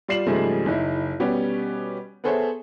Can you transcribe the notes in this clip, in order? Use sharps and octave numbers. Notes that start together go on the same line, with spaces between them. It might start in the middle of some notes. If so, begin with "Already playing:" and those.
G3 F4 D5 C7 E7 F#7
G#2 C#3 F3 G3 A3 G#4
F#1 D#4 E4
B2 G3 B3 C#4 G4
B3 G#4 A4 C5 C#5 E5